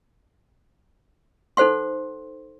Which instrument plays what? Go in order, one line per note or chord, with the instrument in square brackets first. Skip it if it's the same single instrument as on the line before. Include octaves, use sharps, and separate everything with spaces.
[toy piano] D#4 A4 C5 F#5 C6